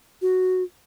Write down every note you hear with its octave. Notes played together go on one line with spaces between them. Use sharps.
F#4